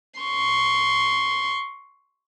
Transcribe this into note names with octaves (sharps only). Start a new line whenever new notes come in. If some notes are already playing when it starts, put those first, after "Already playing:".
C6 C#6